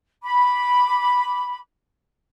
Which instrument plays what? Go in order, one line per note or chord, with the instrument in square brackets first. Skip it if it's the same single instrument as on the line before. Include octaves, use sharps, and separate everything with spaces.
[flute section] B5 D6